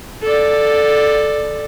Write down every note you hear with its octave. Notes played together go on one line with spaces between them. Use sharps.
A4 D5